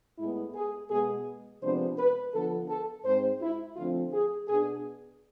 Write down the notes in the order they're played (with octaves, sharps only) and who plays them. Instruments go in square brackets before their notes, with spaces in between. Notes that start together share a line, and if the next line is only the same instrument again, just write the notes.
[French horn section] A2 G#3 B3 E4
G#4
B2 G#3 B3 G#4
C3 F3 G#3 B3 D4 C5
B4
D3 F3 B3 A4
A4
G#2 G#3 C4 C5
E4
D3 F3 A3 C4 F4
G#4
B2 B3 D4 G#4